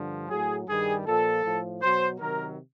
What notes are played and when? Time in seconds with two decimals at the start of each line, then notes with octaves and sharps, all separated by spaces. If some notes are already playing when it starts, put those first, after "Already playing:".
Already playing: G2 D3 F3
0.30 A2 F#3 G#4
0.68 G2 D#3 G3 G#4
1.05 A#2 F3 A4
1.44 A2 F3
1.82 B2 F#3 C5
2.20 C3 D#3 F#3 A#4